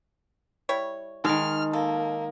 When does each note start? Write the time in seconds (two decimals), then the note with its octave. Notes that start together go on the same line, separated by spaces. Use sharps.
0.69 G3 E4 C#5
1.25 D#3 G#3 D#4 F6
1.73 A#3 A4